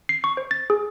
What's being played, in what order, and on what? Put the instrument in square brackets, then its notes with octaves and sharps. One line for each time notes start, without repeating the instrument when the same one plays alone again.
[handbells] C7
C#6
C5
A6
G#4